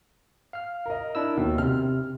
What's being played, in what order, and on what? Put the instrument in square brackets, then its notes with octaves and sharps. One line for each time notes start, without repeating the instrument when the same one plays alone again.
[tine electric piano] F5 F6
[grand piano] A#4 D#5
[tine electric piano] D4 E4 E6
[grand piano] D#2 [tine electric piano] B2
[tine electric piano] C3 [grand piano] F6